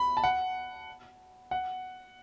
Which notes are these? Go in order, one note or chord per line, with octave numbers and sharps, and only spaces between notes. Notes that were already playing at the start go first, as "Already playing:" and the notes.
Already playing: B5
A5
F#5
F#5